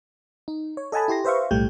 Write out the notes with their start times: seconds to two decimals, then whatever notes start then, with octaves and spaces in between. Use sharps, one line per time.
0.48 D#4
0.77 C#5
0.92 A4 D#5 F#5 G#5 A5 B5
1.08 E4 G4 C6 A#6
1.24 B4 C5 E5 F5 C#6
1.51 B1 A2 G3 A3 G4 G6